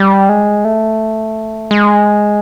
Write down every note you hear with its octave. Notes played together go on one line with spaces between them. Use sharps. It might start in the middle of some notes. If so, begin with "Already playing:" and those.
Already playing: G3
G#3
A3
G#3